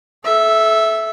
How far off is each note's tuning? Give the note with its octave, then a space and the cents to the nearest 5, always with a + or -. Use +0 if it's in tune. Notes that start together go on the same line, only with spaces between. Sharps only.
A4 -30 E5 +0